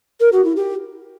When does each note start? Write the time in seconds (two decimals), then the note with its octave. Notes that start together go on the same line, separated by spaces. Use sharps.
0.20 A#4
0.32 F#4
0.44 E4
0.56 G4